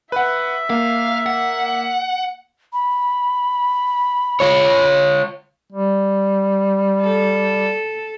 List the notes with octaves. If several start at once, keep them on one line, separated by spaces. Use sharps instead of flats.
B4 E5 F#5
A#3 F5
F#5
B5
F4 C#5
G3
A4